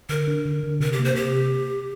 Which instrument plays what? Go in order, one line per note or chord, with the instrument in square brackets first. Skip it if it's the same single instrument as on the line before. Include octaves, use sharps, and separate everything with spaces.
[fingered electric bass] D3 [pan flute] A#4
[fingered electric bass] D4
D3
D3
[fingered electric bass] C3 [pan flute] A#4
[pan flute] G4
[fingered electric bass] A#3
[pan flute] C5
[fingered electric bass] C3 [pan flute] G4